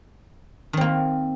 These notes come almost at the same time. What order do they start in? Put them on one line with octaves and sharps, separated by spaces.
D#3 C4 A#3